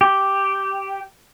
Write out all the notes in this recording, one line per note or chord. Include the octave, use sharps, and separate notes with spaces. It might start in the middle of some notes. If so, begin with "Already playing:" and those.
G4